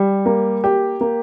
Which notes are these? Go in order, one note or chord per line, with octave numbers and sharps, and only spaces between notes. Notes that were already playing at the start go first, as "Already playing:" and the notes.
Already playing: G3
A#3
G4
A#3